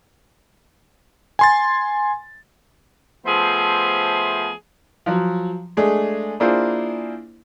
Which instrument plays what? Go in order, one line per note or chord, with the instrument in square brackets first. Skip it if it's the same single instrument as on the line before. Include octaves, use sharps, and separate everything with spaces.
[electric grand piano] G#5 C6 A6
[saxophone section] F3 A3 B3 G#4 C5 E5
[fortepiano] F3 F#3
G#3 A3 D4 G#4
A#3 D4 E4 F4 G#4 C5